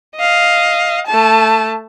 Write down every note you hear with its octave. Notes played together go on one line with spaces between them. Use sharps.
D#5 F5
A3 A5